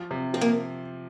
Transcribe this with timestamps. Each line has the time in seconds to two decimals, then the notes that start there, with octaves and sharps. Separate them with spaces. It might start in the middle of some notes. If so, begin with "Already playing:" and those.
Already playing: F3
0.11 C3
0.34 F3 C4
0.41 A#3